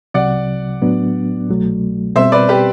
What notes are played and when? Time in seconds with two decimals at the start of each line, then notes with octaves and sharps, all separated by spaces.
0.14 C2 C3 F#3 D5 F#5
0.82 A2 F#3 B3 D4
1.49 C2 B2 F#3 A3
2.16 B2 G3 C4 C5 E5
2.32 B4 D5
2.49 G4 B4